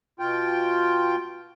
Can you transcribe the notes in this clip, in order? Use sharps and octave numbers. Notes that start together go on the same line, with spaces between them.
B2 F4 G5